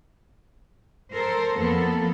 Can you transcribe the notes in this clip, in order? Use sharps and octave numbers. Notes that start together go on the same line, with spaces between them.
A4 A#4 C5
F2 A#3 B3 A4